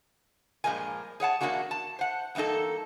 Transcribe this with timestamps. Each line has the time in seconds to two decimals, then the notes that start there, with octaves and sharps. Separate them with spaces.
0.64 G2 A#2 F3 G#3 A#4 G#5
1.20 G#4 C#5 F#5 A5
1.41 E2 C3 A#3 D4 F#4 G#4
1.71 A5
1.99 C5 F#5
2.35 E2 G2 A#3 D#4 A4